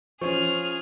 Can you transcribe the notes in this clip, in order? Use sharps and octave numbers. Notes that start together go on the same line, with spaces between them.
F3 C#4 G#4 C5 C#6 F6